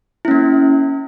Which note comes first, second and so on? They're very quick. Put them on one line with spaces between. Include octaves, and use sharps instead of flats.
E4 C#4 A#3